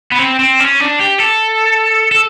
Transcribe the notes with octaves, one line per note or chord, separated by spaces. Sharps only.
B3
C4
C4
C#4
D4
G4
A4
A4